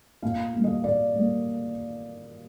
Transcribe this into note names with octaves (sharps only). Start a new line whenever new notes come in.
A#2 F5
G3 A#3
D#5
A#2 D5
G3 A#3